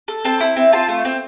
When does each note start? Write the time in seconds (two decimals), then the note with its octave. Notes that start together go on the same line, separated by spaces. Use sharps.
0.08 A4
0.25 C4 A5
0.40 E4
0.56 C4
0.72 F4 A5
0.88 A3
1.05 C4